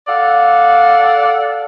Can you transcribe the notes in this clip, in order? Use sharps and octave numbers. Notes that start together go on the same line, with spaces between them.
A4 D5 F5 F#5